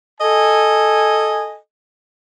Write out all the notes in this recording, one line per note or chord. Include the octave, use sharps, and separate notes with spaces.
A4 D#5 G#5